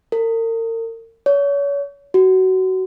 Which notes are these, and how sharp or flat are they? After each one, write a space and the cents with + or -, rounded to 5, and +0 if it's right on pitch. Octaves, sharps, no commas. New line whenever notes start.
A#4 -40
C#5 +35
F#4 +20